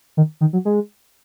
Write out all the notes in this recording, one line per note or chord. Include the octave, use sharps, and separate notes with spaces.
D#3
D#3
F#3
G#3